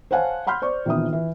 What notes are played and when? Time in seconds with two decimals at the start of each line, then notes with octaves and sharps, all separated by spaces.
0.11 C5 C#5 F5 F#5 G#5 A5
0.47 F#5 B5 C6 F6 G6
0.62 C5 D5 C#6
0.86 A#1 D#3 E3 B3 D#6
1.13 E3